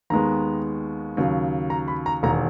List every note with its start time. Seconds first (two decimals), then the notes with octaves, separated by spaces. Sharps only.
0.10 D#2 D#3 G#3 B3 A#5
1.17 D#2 C#3 F#3
1.70 A#5
1.88 B5
2.06 A#5
2.23 E1 D#2 D#3 A#5